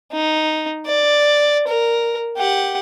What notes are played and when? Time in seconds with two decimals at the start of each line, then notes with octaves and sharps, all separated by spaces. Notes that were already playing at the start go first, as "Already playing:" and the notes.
0.12 D#4
0.86 D5
1.68 A#4
2.37 G4 F#5